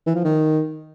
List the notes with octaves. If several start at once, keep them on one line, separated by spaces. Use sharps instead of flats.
E3
F3
D#3